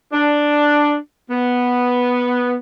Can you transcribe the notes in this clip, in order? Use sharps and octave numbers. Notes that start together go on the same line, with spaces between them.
D4
B3